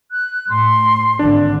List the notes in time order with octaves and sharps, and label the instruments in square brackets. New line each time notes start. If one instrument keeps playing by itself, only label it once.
[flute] F#6
[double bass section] A2 [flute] C6
[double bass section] G#1 D3 [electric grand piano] D4